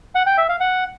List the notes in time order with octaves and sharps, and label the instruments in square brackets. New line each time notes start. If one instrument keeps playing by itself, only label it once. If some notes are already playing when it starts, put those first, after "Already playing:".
[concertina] F#5
G5
E5
F5
F#5